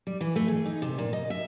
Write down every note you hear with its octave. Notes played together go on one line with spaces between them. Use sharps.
G3
E3
A3
G#4
D#4
C3
A#2
D#5
E5